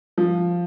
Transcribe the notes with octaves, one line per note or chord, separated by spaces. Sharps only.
F3